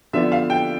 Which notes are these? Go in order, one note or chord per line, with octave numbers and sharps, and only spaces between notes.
D3 F3 B3 D4 E5
F5
G5